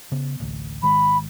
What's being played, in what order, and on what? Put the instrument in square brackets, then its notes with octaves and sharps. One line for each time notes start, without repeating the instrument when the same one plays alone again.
[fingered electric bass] C#3 B3
A1 D2
[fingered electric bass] G#1 D#3 G#3 [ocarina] B5